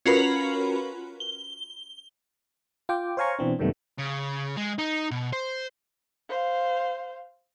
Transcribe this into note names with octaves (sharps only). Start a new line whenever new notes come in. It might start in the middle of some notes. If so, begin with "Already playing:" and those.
C#4 F4 F#4 A#4 B4 B5
G7
F4 G5 D6
C5 C#5 F5 G#5 A#5 C#6
B2 E3 C4 D4
F#2 C3 D#3 G3 A3 B3
C#3
G#3
D#4
B2
C5
C5 F5